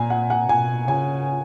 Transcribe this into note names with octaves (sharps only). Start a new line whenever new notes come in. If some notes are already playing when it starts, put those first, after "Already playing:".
Already playing: A#2 G#5 A#5
F#5
F#5
B2 G#5
C#3 G#5